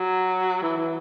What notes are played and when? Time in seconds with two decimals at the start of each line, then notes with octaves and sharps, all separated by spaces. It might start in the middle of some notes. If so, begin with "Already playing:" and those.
Already playing: F#3
0.62 E3
0.77 E3